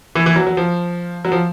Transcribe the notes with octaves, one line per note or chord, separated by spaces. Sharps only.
E3
E3
F#3
F#3
F3
F#3
F3